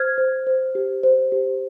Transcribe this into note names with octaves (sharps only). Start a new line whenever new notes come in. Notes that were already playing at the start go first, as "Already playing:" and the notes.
Already playing: C5 F6 G#6
C5
C5
G4
C5
G4